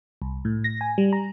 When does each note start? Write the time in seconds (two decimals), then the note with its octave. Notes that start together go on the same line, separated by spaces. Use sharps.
0.22 C2
0.45 A2
0.64 A#6
0.81 G#5
0.98 G3
1.13 A#5